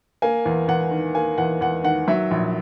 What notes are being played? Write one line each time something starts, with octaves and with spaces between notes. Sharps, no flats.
A#3 G#5
E2
E2 F#5
D#3
A#3 G#5
E2 F#5
E2 F#5
D#3 F#5
F#3 E5
A#1